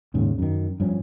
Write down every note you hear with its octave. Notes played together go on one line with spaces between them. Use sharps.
D#2 G#2 C#3
F#2 D#3
G2 F3 C#4